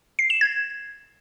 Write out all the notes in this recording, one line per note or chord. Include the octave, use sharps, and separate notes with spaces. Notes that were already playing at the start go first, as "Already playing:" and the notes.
C7
E7
G#6